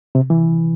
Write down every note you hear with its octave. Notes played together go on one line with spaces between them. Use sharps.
C3
E3